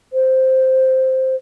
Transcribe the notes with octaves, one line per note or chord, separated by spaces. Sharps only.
C5